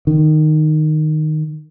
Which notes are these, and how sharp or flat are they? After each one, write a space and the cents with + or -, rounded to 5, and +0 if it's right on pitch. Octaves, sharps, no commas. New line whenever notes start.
D#3 -10